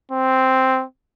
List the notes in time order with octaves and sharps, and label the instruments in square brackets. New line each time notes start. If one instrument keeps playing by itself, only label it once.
[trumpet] C4